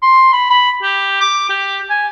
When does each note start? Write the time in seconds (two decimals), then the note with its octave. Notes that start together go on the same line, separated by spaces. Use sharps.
0.03 C6
0.33 B5
0.50 B5
0.83 G4
1.21 D6
1.50 G4
1.90 G#5